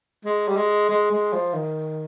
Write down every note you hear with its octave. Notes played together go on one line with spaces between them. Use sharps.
G#3
G3
G#3
G#3
G#3
F3
D#3